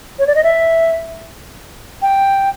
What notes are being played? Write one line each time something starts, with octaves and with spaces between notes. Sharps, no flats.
C#5
D5
D#5
E5
G5